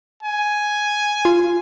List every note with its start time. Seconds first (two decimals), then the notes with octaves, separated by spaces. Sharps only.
0.23 G#5
1.25 F4